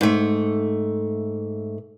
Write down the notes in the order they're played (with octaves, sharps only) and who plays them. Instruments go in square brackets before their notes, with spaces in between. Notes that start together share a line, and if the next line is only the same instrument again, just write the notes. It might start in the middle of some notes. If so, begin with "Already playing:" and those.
[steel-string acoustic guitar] G#2 A3